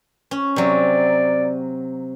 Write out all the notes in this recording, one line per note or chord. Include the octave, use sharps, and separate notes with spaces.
C#4
C3 F#3 D5